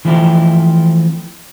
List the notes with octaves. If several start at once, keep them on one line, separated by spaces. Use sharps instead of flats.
E3 F3 A3 C4 E4 G4